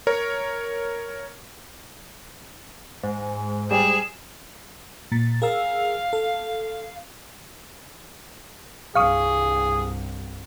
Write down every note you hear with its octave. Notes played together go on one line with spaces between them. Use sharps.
A#4 C#5
G#2
G3 G#4 E7
A#2 A6
G#4 A#4 F5 E6
A4
C2 G2 G#4 F5 C#6 D#6